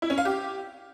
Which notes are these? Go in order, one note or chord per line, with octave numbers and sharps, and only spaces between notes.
E4
C#4
F5
G4